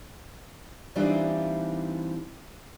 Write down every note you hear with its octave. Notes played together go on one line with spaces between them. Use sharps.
E3 G3 C4 D4 D#4 F4